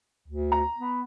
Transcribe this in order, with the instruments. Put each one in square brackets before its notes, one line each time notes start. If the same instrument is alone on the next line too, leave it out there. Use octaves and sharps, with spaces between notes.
[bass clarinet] D2
[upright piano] A#5
[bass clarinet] B3